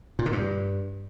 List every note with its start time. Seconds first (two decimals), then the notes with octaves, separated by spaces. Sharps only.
0.19 A#2
0.26 D3
0.33 G2